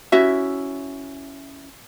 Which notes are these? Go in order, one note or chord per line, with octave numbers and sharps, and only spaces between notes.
C#4 E4 F#4 E5